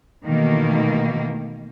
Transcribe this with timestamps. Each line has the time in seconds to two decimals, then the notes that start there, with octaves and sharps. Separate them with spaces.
0.24 B2 D#3 E3 A3 A#3